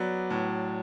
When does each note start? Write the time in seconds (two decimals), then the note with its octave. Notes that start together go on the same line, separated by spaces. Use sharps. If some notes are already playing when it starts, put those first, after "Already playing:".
Already playing: F#3 B3 D5
0.30 A2